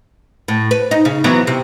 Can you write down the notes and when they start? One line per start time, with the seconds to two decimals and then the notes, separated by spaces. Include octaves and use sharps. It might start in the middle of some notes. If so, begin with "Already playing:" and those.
0.48 A2
0.71 B4
0.91 D#4
1.05 C#3
1.24 E3 F#3 B3
1.47 C3